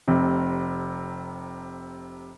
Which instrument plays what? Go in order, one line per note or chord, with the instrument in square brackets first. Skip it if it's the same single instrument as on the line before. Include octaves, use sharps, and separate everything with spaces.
[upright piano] F1 C3